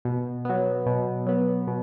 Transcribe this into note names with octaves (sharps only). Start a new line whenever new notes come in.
B2
F#3 B3
B2
F#3 B3
B2